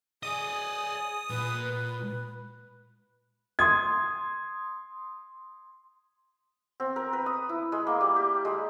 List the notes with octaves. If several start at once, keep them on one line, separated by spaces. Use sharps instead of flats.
G#4 D5 D#5 D#6
A#2 B4
C6 D#6 G#6
C4
A#4
B4
D#6
E4
G#3
A#3
G3
G4
G#3